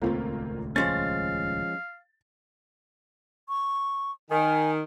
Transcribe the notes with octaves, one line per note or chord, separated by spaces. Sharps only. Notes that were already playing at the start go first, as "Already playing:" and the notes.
D#1 C#2 A3 A#3 C4 F4
F3 G#3 C#4 F5 A6
C#6
D#3 G#5